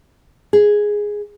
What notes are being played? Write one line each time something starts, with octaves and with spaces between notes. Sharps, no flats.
G#4